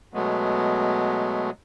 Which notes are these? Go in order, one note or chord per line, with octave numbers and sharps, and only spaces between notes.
B2 F#3 G#3 A3 B3